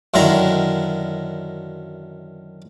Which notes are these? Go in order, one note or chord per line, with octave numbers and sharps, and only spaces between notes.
F#2 D3 D#3 E4 A#5